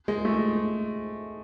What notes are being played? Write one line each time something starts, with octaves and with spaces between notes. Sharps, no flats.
G#3
A3